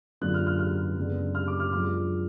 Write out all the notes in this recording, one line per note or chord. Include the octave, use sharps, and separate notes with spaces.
F#2 D3 G#3 D4 F4 F#6
F6
F6
F6
F#2 C#3 G#3 B3 D4
F6
D6
F6
F#2 F3 G#3 D4 F4 F6